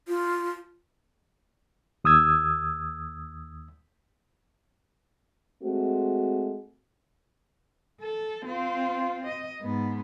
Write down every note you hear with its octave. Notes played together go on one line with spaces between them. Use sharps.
F4
D#2 D#6 E6 G#6
G#3 A3 C4 F#4
A4
C4 F4
D#5
G#2 B3